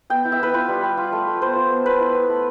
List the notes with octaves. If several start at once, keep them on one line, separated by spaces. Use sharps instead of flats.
B3 G5
E4
E5
B3 B4
F4 B4
G3
G3
F4
A3
A3
B3 C5
F4
B3
B3 B4
E4
B3
A3